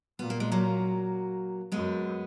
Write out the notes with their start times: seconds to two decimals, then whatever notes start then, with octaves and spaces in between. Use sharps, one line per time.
0.19 A#2 B3
0.30 A#3
0.40 G#3
0.52 F#3 A#3
1.72 F#2 G#3 B3